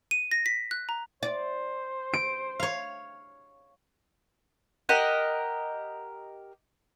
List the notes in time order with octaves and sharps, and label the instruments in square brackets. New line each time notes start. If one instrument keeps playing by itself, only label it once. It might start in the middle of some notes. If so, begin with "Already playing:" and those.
[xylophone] D#7
A#6
B6
F#6
A#5
[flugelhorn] C5 [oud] D5
[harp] D7
[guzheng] C#5 F5
[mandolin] G4 A#4 D#5 F#5